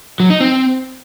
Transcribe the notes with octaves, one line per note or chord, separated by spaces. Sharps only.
F#3
D#4
C4